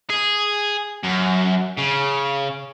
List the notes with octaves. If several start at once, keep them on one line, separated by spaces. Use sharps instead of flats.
G#4
F#2
C#3